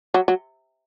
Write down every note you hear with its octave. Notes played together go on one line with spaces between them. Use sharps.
F#3
F#3